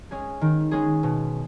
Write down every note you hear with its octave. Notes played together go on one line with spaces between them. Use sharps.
G#3 C#4 G#4
D#3
G#3 C#4 G#4
B2